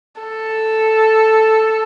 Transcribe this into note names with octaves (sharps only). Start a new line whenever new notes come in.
A4